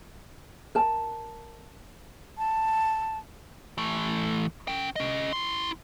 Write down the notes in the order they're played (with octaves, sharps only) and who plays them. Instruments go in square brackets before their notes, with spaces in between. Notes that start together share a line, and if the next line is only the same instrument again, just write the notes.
[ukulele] A#4 A5
[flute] A5
[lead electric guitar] E3 A3
C#4 G5
C#4 D#5
E4 C6